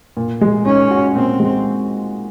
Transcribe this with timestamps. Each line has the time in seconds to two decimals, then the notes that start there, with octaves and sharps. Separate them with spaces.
0.17 A#2
0.41 G#3
0.66 C#4 D#4
0.91 F#4
1.15 A#2 C4
1.40 G#3